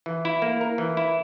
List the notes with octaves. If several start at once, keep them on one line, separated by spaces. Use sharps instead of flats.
E3
E4
A#3
A#4
E3
E4